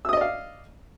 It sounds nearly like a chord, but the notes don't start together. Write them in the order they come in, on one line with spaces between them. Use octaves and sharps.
E6 D#6 D#5 D5 F5